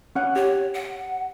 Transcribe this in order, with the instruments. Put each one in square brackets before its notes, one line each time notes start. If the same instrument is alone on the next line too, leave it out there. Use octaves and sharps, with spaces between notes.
[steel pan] C#4 F#5
[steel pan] G4 [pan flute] C#5
[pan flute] F#5